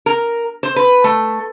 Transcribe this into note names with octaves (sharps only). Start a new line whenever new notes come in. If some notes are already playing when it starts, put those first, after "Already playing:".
A#4
C5
B4
A3